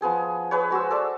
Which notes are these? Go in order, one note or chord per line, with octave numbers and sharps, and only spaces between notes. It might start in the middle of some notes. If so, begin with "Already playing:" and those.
F3 B3 G#4 G5
G#4 B4 C#5
G#3 F#4 C5 E6
A4 D5 E5 A5